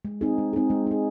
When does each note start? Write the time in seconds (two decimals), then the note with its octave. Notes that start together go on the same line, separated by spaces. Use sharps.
0.05 G#3
0.21 C4 D#4 G#4
0.38 G#3
0.53 C4 D#4 G#4
0.70 G#3
0.87 D#4 G#4